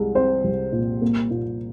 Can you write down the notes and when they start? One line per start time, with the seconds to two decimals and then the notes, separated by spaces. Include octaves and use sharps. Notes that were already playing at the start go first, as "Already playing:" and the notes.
Already playing: C2 G#3
0.15 C4 C5
0.44 C2
0.73 A#2
1.02 A#3
1.31 A#2